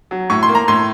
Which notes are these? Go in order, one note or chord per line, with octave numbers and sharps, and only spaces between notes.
F#3
A2 C#6
C6
A#3
A#5
A2 C6